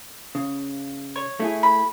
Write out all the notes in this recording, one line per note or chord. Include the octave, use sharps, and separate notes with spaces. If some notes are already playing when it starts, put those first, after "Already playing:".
C#3
C#5
A3 E4 G#4
B5